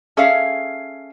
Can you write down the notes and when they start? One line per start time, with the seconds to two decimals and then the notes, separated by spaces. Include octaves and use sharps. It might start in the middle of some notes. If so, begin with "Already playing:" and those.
0.17 C#4 G#4 A4 E5 F5